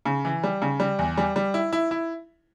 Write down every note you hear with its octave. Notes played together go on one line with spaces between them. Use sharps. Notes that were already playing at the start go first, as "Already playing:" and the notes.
C#3
E3
G3
C#3
G3
E2
G3
G3
E4
E4
E4